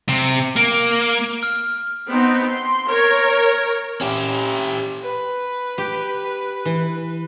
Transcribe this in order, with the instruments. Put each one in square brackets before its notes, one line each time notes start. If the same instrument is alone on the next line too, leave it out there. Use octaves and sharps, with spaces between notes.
[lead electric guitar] C3
A#3
[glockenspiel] F6
[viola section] B3 C4 D#4
C6
A#4 C#5
[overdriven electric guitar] C#4 G4
[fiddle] B4
[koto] G4
E3